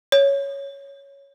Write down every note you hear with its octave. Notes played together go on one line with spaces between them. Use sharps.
C#5